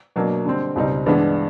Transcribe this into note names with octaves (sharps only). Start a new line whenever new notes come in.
B2 F#3 A#3 D4
D3 G3 C4
C#2 B2 G3 C4 D#4
G2 E3 G#3 B3 D4